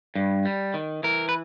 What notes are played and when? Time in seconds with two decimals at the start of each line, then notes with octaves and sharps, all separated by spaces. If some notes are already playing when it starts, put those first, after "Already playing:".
0.15 G2
0.45 G3
0.74 D#3
1.03 E3 A#4
1.29 B4